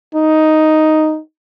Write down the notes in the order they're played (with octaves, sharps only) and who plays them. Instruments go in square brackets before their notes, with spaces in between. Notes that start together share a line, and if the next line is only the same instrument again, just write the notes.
[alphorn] D#4